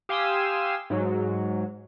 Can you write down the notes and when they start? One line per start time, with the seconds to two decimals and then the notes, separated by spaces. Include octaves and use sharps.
0.09 G4 F5 G#5 C6 D#6 E6
0.90 G#2 F#3